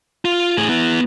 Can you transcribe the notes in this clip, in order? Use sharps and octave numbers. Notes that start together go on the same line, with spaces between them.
F4
A2 G#4
B3 E4